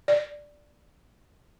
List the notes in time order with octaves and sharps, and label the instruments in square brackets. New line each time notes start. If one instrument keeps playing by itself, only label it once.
[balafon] D5